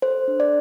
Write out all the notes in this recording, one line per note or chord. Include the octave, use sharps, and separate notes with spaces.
A4 C5
D4
D5